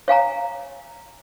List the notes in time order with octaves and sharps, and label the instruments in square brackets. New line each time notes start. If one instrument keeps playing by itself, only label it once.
[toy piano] C#5 F5 G#5 A#5